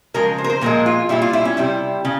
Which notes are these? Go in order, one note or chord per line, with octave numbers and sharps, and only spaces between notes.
C#3 F3 G#3 A#4
C5
A#4
C5
A#2 F3 G#3 A#4
F4
A#2 G3 E4
F4
E4
C#4
C3 G3 E4
C#3